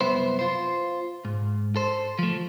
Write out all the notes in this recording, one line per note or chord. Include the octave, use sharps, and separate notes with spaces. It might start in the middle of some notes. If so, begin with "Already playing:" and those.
C2 F#2 B3 E4 C5
F4 C5
G#2
A4 C5
F3 A3